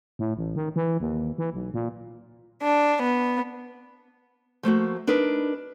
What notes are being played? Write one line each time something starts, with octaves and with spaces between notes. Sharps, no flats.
A2
A1
D#3
E3
D#2
E3
B1
A#2
D4
B3
F3 A3 A#3 F#4
D4 D#4 A#4 B4